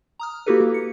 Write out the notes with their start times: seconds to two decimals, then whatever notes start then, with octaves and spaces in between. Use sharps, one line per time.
0.19 A#5 D#6 F6
0.46 A#3 E4 F#4 G4 A4 B4
0.60 A#3
0.74 C#7